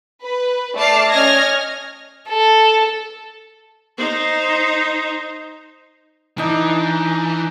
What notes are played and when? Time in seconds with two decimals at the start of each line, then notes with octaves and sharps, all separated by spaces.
0.23 B4
0.76 A3 D5 A5 D6 F6 C7
1.10 C#4 C#5 D#5 F6 G#6 A#6
2.29 A4
3.98 D#4 C5
6.38 E3 D4 D#4